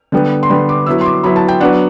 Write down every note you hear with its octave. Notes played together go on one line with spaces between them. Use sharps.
D3 G3 B3
C6
D3 G3 B3 B5
D6
F#3 B3 E4 E6
C6
D6
F#3 B3 E4 B5
A5
G5
F#3 B3 D4 F#5